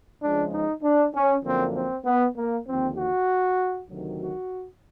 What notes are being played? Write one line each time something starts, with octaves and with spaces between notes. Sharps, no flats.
C#2 C#3 F3 G#3 D4
D#4
D4
C#4
F#2 D3 F3 A#3 C4
C4
B3
A#3
D#2 D3 F3 C4
F#4
D2 C3 D#3 F#3
F#4